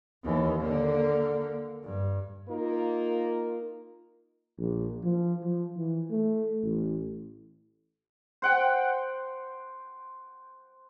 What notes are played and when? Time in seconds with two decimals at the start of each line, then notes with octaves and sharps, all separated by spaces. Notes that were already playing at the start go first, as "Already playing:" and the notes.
0.24 D#2 E3
0.61 D3 A#3
1.84 G2
2.49 A#3 D#4 F4 A#4
4.59 A#1
5.03 F3
5.43 F3
5.77 E3
6.10 A3
6.63 A1
8.42 C5 F#5 G5